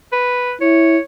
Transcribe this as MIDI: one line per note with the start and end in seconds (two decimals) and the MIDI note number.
0.12 0.53 71
0.61 0.98 64
0.61 1.00 73